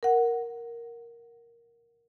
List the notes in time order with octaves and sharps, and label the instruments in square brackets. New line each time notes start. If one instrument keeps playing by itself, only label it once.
[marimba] A#4 F#5